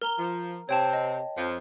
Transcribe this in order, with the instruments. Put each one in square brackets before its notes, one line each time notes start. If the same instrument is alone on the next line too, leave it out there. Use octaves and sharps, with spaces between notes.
[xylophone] A#4 A#5 G7
[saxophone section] F3
[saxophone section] C3 C4 [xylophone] C#5 G5 A5
[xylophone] D#5
[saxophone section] F2 F3